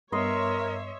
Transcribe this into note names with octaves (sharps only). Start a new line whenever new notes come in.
G2 B3 A#4 C#5 D#5 E5 C6